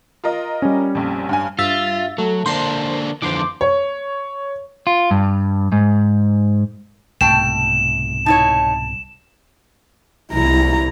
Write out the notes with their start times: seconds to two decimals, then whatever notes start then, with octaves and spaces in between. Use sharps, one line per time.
0.24 F4 A#4 D#5
0.62 G3 C#4
0.95 A#1 F2
1.29 G2 G#5
1.59 G2 F4 E5 A6
2.18 F#3 A3
2.46 D3 A#3 D4 C5 C6 C7
3.22 F2 D3 E3 C5 C6 D6
3.61 C#5
4.87 F4
5.11 G2
5.72 G#2
7.21 C2 G#2 B2 A3 G5 A5 E7
8.26 D#4 E4 C#5 A5
10.32 C2 E4 A#5